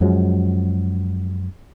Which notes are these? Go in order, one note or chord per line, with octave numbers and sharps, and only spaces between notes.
F#2 F3 F#3 G#3